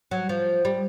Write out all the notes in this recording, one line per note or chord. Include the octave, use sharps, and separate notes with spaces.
F#3
F3
G3